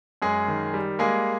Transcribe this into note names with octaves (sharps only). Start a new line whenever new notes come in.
F#2 G#3 G#4
D#3
G3
G#3 A#3 G#4